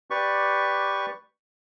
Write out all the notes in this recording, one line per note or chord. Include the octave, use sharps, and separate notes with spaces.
G4 B4 D5 C#6